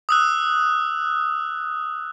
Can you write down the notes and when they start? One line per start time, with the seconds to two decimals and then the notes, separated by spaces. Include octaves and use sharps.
0.09 D#6 E6 F#6